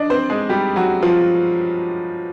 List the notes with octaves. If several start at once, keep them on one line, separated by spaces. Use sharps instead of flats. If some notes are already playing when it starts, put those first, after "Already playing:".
Already playing: D4 D#4 D5 D#5
C4 C5
G#3 G#4
G3 G4
F#3 F#4
F3 F4